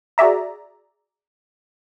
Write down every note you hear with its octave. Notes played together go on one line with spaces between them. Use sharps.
F#4 G#4 D5 E5 A#5